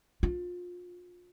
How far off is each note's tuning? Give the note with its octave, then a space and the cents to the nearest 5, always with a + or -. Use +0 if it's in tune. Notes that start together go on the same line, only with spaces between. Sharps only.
D4 +0 F4 +30